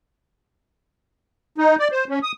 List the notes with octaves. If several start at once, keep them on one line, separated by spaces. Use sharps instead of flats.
D#4
D5
C5
C#4
D#6